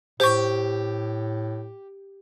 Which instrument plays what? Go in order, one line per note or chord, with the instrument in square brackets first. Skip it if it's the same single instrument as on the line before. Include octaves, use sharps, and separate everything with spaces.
[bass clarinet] A2 [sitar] G4 [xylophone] C5 C#6